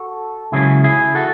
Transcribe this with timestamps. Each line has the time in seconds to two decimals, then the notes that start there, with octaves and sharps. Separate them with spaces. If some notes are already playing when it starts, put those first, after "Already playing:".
Already playing: F#4 A4
0.52 C#2 C#3 F#3 E4 G#4
0.84 E4 G#4
1.15 F#4 A4